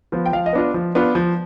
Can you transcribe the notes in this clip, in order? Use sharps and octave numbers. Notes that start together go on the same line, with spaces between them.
F3 B3 F4
G5
F3 F5
D#5
B3 D4 F4
F3
B3 D4 F4
F3